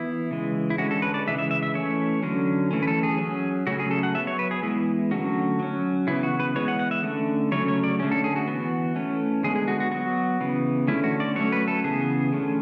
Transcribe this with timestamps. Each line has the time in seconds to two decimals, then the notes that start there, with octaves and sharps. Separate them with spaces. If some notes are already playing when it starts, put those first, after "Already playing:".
Already playing: E3 B3 E4
0.31 C#3 E3 G#3
0.70 E4
0.78 D3 G#3 C#4 F#4
0.91 A4
1.02 B4
1.14 D5
1.27 C#3 E3 G#3 E5
1.39 E5
1.51 E5
1.63 E5
1.74 E3 A3 C#4 C#5
2.22 D3 F#3 C#4
2.71 E3 A3 C#4
2.82 B4
2.87 A4
3.03 G#4
3.18 F#3 C#4
3.67 C#3 F#3 A3 C#4 F#4
3.79 G#4
3.91 A4
4.03 F#5
4.15 F#3 B3 E5
4.27 C#5
4.39 B4
4.51 G#4
4.63 E3 G#3 B3 E4
5.11 D3 F#3 A3 C#4 F#4
5.60 F#3 C#4
6.07 C#3 E3 B3 E4
6.23 F#4
6.40 B4
6.56 E3 G#3 B3 C#5
6.68 F#5
6.79 F#5
6.91 E5
7.03 D3 A3 C#4
7.52 C#3 F#3 A3 C#4 C#5
7.68 C#5
7.84 D5
8.00 D3 A3 C#4
8.11 A4
8.24 G#4
8.36 F#4
8.48 E3 B3
8.96 E3 A3 C#4
9.43 D3 G#3 B3 G#4
9.56 G#4
9.68 F#4
9.80 F#4
9.91 F#3 B3 F#4
10.41 C#3 E3 B3
10.87 D3 A3 C#4 E4
11.04 F#4
11.20 D5
11.36 F#3 A3 C#4 C#5
11.52 B4
11.68 A4
11.84 C#3 E3 B3 G#4
12.32 D3 A3 C#4